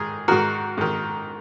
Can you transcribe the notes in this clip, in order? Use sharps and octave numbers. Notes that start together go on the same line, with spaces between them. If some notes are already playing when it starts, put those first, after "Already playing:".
Already playing: G#2 D#3 G#4
G#2 D#3 F#4 A#4
G#2 D#3